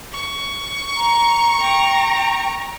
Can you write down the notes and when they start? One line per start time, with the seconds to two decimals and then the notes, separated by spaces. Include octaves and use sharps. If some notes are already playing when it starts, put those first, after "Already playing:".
0.11 C#6
0.97 A#5
1.60 G5 A#5